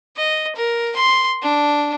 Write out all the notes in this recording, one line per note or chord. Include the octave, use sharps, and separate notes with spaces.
D#5
A#4
C6
D4